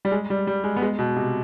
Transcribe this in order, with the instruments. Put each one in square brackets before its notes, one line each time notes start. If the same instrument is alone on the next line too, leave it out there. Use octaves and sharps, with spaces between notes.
[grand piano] G3
G#3
G3
G3
G#3
B3
G#3
B2
C3